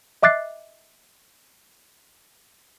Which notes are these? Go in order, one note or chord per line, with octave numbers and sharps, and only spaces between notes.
D#5 E5 D6 F#6 A6 C7